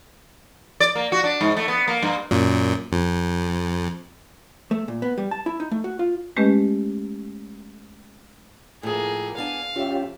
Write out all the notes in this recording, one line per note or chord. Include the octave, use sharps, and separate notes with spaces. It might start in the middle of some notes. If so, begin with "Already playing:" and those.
D5
A#3
F#4
D4
G#2
A3
B3
A#3
G2
F#2 A#2
F2
A3
A#2
B3
G3
A5
E4
D#4
A3
F#4
F4
G#3 A3 C#4 G4 B4 D#5
A2 F3 A#3 G#4
B3 D4 F5 G#5
F2 C#4 F4 G4 E5